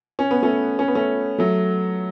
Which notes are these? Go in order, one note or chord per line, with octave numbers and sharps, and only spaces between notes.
C#4
B3
A3 C#4
C#4
B3
A3 C#4
F#3 A3